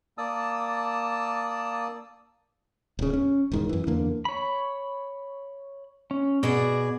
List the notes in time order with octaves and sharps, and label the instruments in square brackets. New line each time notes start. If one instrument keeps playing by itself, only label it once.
[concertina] A#3 D5 A5 D#6 E6
[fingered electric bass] D1 C#3
C#4
E1 G#2 D#3
F#2 E3
E2 D3 A#3
[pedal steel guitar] C#5 B5
C#4
[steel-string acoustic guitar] B2 F#4 G#4 [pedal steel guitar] D5